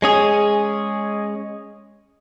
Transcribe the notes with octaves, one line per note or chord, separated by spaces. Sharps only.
G#3 C#4 G#4